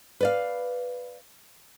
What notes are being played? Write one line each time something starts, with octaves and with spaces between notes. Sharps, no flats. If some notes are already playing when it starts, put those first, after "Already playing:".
B4 D5 F5